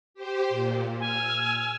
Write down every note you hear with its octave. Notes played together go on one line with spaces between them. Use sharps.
G4 C5
A#2
G#5 E6 F6